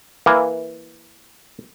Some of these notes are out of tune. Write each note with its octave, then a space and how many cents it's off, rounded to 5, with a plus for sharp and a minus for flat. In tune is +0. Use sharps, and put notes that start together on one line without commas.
E3 +0 A#3 +0